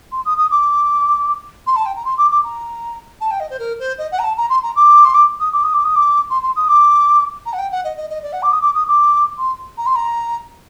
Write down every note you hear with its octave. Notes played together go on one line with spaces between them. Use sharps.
C6
D#6
D#6
D6
C6
A5
G5
A#5
C6
D6
D6
A#5
A5
G5
D#5
C5
A#4
C5
D#5
F#5
A#5
A5
A#5
C6
A#5
D6
C6
D6
D#6
D6
D#6
D6
D#6
D6
C6
C6
D#6
D6
A#5
F#5
G5
F#5
D#5
D#5
D#5
D5
F#5
D6
D#6
D6
D#6
D6
C6
A#5
C6
A#5